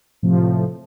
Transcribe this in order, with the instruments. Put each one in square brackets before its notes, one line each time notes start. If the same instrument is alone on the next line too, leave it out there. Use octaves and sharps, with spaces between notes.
[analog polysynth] A2 C3 F3 A3